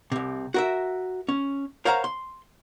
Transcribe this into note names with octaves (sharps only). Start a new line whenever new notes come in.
C2 C3
F#4 A#4 E5
C#4
A#4 C5 C#5 F5 F#5 A#5
C6